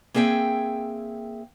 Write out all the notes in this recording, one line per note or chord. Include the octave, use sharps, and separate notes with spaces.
A#3 C4 G#4 E5 G5